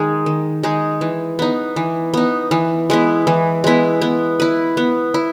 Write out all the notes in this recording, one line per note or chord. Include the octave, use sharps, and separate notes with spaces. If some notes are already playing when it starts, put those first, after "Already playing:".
Already playing: D#3 G#3 D#4 G#4
D#3
G#3 D#4 G#4
E3
B3 D#4
E3
B3 D#4
E3
G#3 B3 E4
E3
G#3 B3 E4
B3
E4 B4
B3
E4